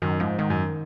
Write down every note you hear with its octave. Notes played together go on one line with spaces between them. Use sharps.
F#2 D#3
G#2 F3
G#2 D#3
F#2